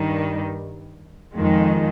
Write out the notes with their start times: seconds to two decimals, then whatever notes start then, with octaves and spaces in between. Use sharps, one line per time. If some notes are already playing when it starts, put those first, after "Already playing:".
Already playing: G2 D#3 G3
1.34 F2 D#3 G#3